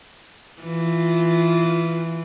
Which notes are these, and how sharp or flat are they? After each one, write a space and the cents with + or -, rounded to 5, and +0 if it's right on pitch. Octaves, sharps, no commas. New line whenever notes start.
E3 +0 F4 -10